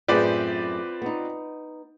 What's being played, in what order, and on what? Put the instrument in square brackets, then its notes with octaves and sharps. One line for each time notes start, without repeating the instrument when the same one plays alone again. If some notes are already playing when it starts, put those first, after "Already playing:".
[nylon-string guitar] F#2 A2 G#4 [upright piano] C4 B4 D5 [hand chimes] F4
[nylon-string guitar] B3 D#4